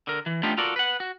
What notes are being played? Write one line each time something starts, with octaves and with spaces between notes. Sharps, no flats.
D3 A#4
E3
A3 B3 D4 D#4 F4 G4
F4 F#4 A4 A#4 D5
B4 F#5
F#4